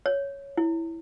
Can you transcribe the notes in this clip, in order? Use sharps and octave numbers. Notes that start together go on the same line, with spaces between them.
C#5
E4